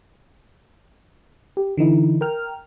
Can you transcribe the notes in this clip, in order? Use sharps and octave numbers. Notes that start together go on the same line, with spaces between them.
G4
D3 E3 D#4 E4
A#4 G5 F6